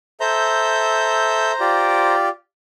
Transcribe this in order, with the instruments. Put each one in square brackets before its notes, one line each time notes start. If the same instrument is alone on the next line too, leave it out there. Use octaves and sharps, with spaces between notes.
[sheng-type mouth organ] A4 E5 G6 [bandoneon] C5 A#5
[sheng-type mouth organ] F4 G4 D5